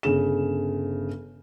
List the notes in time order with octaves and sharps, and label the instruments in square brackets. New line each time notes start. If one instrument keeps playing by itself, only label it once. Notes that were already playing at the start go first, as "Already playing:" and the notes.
[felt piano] G1 C#3 E7